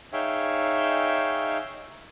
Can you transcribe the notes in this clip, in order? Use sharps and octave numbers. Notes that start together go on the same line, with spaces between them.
D#4 G#4 C#5 E5 F5 G5